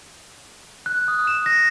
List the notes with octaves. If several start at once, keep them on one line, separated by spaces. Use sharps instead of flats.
F#6
D#6
E7
A#6